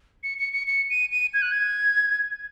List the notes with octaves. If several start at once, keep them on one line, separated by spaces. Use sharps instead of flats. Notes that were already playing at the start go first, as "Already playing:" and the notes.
C#7
C#7
C#7
C#7
D#7
D#7
G#6
F#6
G#6